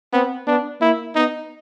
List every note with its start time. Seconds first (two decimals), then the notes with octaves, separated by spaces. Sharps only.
0.13 B3 C4
0.47 B3 D4
0.81 A#3 E4
1.15 B3 D#4